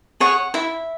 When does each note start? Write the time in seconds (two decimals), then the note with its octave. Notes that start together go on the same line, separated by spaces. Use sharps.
0.20 G#4 C#5 F#5
0.54 E4 E5